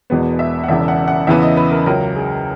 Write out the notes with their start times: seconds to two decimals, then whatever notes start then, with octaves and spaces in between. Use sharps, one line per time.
0.10 E1 E2 B2 G#3 B3
0.39 E5
0.64 F#5
0.68 E1 E2 C#3 E5
0.88 F#5
1.08 F#5
1.27 E2 C#3 E3 B3 E5
1.42 D#5
1.57 B4
1.71 A#4
1.86 C#2 C#3 F#3 A#4
2.16 G#4